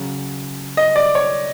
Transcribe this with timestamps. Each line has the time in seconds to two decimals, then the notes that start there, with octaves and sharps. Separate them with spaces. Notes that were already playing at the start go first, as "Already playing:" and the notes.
Already playing: C#3 F#3
0.77 D#5
0.96 D5
1.15 C#5